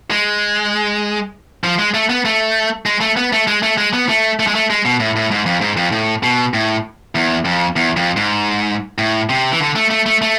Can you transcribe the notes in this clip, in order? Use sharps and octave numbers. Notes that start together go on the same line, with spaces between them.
G#3
F3
G#3
A3
B3
A3
G#3
A3
B3
A3
G#3
A3
G#3
B3
A3
A3
G#3
A3
G#3
B2
A2
A2
G#2
F2
G#2
F2
A2
B2
A2
E2
F2
E2
F2
G#2
A2
C3
E3
D3
A3
A3
A3
A3